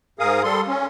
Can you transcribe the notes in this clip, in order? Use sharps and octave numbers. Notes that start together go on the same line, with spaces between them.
G#2 G#4 A#4 F5 D#6
G3 A4 C6
C#4